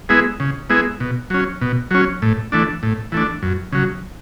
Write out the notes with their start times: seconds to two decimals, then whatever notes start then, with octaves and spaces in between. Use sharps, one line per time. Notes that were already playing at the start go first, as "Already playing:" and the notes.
0.09 G#3 B3 E4 G#4
0.40 C#3
0.70 G#3 B3 E4 G#4
1.00 B2
1.30 F#3 C#4
1.62 B2
1.91 F#3 C#4
2.22 A2
2.52 E3 A3 D4
2.83 A2
3.12 E3 A3 D4
3.42 F#2
3.72 C#3 F#3